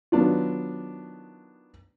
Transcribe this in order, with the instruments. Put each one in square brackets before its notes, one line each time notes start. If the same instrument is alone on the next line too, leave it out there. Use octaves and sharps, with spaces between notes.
[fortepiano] D#3 F#3 B3 D4 F4